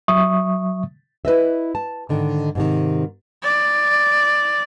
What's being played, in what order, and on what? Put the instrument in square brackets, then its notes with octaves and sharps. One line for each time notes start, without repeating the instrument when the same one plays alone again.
[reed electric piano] F#3 E5 C#6 D#6
[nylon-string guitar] E4 B4 D#5 E5
A5
G#2 D3 D#3
G#2 C3 D#3
[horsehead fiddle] D5